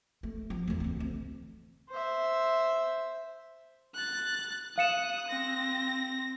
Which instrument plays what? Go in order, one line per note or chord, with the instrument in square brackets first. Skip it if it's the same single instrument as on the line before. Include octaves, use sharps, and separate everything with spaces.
[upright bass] A3
F3
E2 A3
D2 C4
D2
[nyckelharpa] C5 E5
[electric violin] F#6 A6
[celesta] F5 C#7 E7 [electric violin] D#6 F#6
[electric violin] C4 A#6